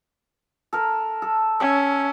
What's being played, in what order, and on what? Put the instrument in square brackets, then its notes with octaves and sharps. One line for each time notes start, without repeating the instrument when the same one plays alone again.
[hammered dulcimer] A4 A#4
A4
[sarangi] C#4 [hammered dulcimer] E5